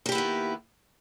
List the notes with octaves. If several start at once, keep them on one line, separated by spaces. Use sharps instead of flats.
D#3 A#3 B3 E4 G4